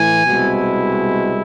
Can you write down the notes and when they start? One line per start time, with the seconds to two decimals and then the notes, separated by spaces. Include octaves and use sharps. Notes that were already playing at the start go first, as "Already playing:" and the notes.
Already playing: A2 E3 G#5
0.26 C2 B2 G#3 C4 E4